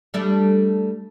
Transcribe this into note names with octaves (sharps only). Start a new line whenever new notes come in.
G3 A3 D4